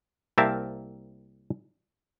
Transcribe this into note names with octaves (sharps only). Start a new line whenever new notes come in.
C2 A#3 C4 A#4 E5 A5